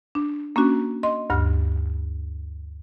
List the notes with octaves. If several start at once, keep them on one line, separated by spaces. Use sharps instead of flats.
D4
A#3 C#4 D4 F#4
D#5 C6
D2 G2 F6